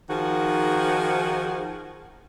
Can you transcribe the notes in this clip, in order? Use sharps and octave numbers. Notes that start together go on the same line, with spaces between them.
D#3 F3 F#4 G#4